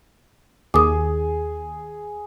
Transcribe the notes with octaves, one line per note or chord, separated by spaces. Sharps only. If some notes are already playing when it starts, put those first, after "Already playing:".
D#2 G#4 D6 D#6